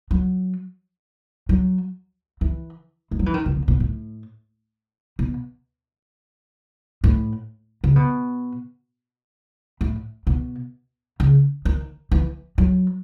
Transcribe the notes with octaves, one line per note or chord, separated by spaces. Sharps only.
F#3
F#3
E3
G#3
F#3
E3
D#3
C#3
B2
B2
A2
B2
A2
C#3
B2
A2
B2
C#3
D#3
E3
F#3